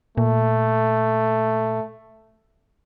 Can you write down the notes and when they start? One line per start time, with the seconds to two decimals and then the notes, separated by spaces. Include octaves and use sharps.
0.17 A#2 A3